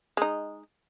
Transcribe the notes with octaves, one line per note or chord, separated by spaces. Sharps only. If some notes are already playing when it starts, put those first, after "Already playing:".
G#3 D#4